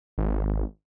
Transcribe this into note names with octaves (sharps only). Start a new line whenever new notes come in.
G#1